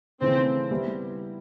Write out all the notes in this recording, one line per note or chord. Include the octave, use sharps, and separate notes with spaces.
C#3 E3 A3 C4
G3 B3 E4 G4